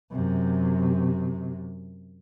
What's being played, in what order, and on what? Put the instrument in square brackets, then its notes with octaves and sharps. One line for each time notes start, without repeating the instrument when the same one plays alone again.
[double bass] F#2 C3